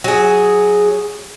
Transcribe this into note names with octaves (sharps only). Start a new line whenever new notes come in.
F#3 G#4